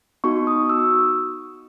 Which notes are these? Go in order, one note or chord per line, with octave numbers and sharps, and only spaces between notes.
B3 D#4 F#4 C#6
D#6
E6